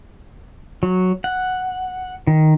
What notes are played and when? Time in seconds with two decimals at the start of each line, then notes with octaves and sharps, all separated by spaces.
0.83 F#3
1.24 F#5
2.27 D#3